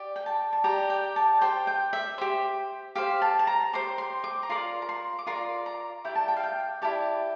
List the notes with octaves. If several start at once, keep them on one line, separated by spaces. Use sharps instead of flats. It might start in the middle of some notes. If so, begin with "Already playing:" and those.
Already playing: G4 D5
G5
A5
A5
G4 D5 A#5
G5
A5
G4 C5 G5
G5
E5
G4 C5
G4 C5 F5
A5
A5
A#5
G4 C5 C6
C6
D6
A#5
F4 A#4 D5 C6
A#5
C6
D6
F4 A#4 D5 C6
A#5
E4 G4 D5 G5
A5
G5
F5
G5
E4 G4 D5 A5